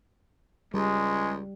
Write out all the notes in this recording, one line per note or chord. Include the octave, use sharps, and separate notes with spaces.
C#2 G3 G#3